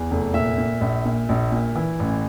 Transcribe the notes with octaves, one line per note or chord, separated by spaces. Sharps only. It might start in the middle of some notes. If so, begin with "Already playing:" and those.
Already playing: E2
F1
A#2 E5
A#2
A#1
A#2
A#1
A#2
E3
A1